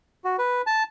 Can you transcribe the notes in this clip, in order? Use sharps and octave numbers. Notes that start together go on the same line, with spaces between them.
F#4
B4
A5